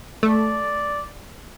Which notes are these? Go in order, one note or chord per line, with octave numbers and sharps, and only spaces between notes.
A3 D5